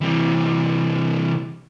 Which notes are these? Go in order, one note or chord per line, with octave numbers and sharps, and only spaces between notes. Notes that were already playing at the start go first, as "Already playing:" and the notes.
C3 E3